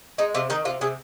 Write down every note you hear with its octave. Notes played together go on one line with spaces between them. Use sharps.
G#3 D#4
C3 F4
D#3 D#4
C3 F4
C3 G#4